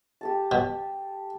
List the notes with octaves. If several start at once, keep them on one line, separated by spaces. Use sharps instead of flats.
G4 A4 A5
B2